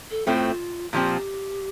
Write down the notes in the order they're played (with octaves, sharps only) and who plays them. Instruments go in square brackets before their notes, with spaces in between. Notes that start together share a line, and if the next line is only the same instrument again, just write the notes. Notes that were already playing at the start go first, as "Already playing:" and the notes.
[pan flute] A4
[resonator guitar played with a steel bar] A2 A3 C4 [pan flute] F4
[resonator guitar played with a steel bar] A#2 F3 C4 [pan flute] G4